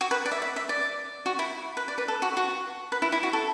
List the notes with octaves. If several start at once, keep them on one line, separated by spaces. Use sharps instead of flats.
F#4
B4
D5
E5
E5
E5
D5
F#4
E4
B4
D5
B4
A4
F#4
F#4
B4
E4
E4
F#4
A4